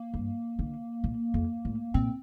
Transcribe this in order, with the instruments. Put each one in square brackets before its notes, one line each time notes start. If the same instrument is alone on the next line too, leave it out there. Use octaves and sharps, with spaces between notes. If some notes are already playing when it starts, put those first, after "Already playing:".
Already playing: [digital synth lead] A#3
[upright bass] G2
D3
A#2
F2
A2
[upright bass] A#2 [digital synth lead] C4